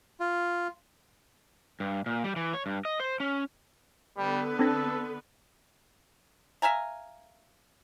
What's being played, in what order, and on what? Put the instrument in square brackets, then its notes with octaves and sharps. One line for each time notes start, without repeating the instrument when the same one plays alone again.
[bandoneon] F4
[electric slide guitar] G2
A#2
G3
E3
C#5
G2
D#5
C5
C#4
[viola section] D3 B3 B4 [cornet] G3
[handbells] C4 D4 A#6 [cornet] A4
[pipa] E5 F5 G#5 A#5